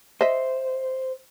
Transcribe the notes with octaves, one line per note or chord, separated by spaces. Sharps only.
C5 D#5 E5